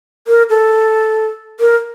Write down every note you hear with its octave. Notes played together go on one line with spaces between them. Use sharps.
A#4
A4
A#4